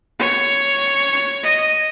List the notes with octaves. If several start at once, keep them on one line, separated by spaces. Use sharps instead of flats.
C#5
D#5